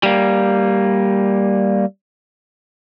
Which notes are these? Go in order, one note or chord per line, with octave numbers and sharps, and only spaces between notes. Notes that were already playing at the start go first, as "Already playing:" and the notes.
G3 A#3